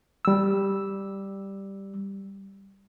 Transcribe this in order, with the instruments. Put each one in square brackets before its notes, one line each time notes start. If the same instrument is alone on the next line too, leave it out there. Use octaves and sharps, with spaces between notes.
[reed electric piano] G3 E6